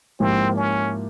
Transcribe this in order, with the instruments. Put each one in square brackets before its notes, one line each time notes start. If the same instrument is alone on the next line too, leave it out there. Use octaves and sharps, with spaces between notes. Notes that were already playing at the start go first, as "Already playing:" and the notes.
[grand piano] G#2 F3 A#3 E4 G4 [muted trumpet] C4
[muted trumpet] C#4